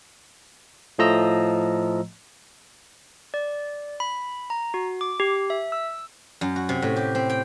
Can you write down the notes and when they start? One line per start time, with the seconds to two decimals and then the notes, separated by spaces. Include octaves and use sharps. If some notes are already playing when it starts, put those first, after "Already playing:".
0.98 A2 F3 A3 D#5 A#5 E6
3.34 D5
4.00 B5
4.50 A#5
4.74 F#4
5.01 D6
5.20 G4
5.50 E5
5.72 E6
6.41 F#2
6.56 F#4
6.69 C3
6.82 A2
6.96 G4
7.15 C4
7.30 G5